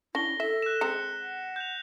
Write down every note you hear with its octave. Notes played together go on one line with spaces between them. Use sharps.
C#4 D4 E4 A#6 G7
A4 E5 B6
F#6 E7
G#3 C4 A#5 C#7
F#5
G6 F7